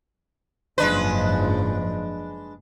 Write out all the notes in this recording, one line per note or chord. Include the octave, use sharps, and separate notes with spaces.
F#1 G#2 F3 G#3 D4 B4